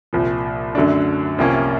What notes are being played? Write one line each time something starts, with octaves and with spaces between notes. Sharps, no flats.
C2 A#2 F3
F#2 D3 F#3 A3 D4
C2 C3 F3 A#3 C#4